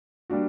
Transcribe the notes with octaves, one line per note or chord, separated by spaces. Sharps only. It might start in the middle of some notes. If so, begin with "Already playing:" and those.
G3 A#3 D4 F#4